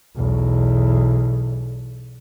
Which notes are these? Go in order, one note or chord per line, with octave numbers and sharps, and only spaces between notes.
B1 E2